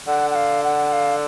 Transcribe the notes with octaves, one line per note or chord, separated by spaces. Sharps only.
D3 F#5
F#5
F5
F#5
F5